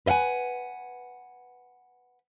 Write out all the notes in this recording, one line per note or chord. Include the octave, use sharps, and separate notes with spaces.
B4 D#5 F5 F#5 G#5